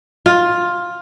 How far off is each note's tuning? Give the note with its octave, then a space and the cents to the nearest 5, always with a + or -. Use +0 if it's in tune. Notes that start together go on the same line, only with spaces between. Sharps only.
F4 +10